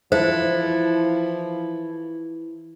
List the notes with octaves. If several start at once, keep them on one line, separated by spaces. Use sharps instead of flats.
E3 F3 E4 A4 C5